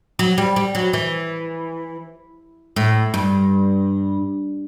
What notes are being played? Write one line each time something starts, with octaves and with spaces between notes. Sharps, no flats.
F#3
G3
G3
F#3
E3
A2
G2